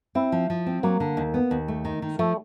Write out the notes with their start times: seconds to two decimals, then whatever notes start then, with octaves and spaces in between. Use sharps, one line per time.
0.15 C4 E4
0.32 F3
0.50 F3
0.66 C4
0.83 F#3 A#3
1.00 D3
1.17 D#2
1.34 B3
1.51 D#2
1.68 A3
1.85 D#3
2.02 D#3
2.19 F3 A3